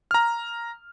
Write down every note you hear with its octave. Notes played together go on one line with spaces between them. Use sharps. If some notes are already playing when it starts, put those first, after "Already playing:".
A#5 F6